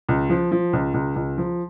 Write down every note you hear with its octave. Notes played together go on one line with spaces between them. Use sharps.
C#2
F3
F3
C#2
C#2
C#2
F3